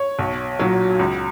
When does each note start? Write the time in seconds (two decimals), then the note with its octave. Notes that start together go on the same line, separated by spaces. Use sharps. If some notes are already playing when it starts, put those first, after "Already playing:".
Already playing: C#5
0.19 B1
0.59 A#2 F#3
0.99 C#2